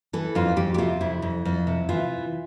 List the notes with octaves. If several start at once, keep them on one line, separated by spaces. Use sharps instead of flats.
E3 A4
F2 F4
F2 G4
G4
C3 F4
F2 E4
F2
F2
C3
E3 F4